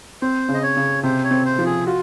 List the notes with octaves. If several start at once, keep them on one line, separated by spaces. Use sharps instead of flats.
C4 C5
C#3
D#5
C#5
C#3
C3 C5
C#5
C4
C5
F3
G#4
F4 F#4